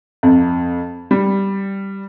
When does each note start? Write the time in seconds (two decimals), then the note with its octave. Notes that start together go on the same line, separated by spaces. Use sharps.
0.23 F2
1.11 G3